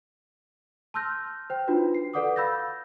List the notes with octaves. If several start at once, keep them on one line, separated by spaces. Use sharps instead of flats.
A5 C6 E6 F6 G6 A#6
C5 G5
D4 D#4 F4 F#4 B4
C7
A4 B4 D5 F#5 D6 D#6
F5 B5 E6 G6 A6 A#6